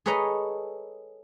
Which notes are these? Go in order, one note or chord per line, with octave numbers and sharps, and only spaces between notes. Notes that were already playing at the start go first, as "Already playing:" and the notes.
G#4 A4 B4 C#5 D#5 A#5